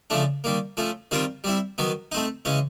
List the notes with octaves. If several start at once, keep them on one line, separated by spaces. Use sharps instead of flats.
C#3 F3 A3 D4
D#3 G3 A#3
F3 A3 C#4
D#3 G3 C4 F4 A#4
G3 C4 E4
D#3 F#3 B3
A3 C4 D#4
C#3 E3 G#3 C#4